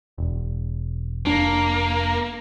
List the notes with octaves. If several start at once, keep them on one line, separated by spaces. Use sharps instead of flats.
E1
F1 A#3 D4